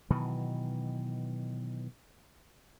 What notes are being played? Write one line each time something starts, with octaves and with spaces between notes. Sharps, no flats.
B2 D#3 E3 F#3